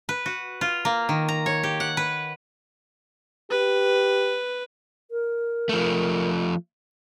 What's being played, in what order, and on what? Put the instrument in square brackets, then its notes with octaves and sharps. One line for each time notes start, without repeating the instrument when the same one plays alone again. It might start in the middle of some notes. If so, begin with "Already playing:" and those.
[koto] B4
F#4
F4
A#3
D#3
A#5
C#5
G4
F#5
B4
[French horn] G4 [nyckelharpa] B4
[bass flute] A#4
[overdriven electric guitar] F3 A3